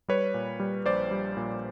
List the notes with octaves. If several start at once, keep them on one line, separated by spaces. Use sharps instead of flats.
G3 B4 C#5
A#2
G3
A#1 C5 D5
G3
A#2